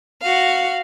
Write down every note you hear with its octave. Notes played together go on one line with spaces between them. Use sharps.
F#4 F5